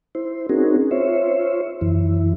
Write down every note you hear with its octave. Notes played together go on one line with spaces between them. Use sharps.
E4 C5
C4 C#4 D#4 F#4 G#4 A#4
F4 C5 C#5 E5
F#2 E3 E4